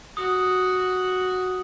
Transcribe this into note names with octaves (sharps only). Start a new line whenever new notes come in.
F#4 D#6